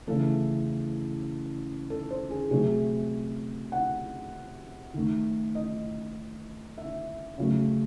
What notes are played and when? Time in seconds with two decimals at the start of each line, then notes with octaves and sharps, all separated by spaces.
0.07 C#3 E3 A3 A4
1.90 A4
2.10 C5
2.30 G#4
2.51 C3 F#3 A3 G#4
3.72 F#5
4.94 D#3 A3
5.55 D#5
6.78 E5
7.38 C#3 F#3 A3